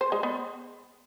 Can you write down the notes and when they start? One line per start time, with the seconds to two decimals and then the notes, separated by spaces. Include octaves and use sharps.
0.01 C5
0.12 G#3
0.23 B3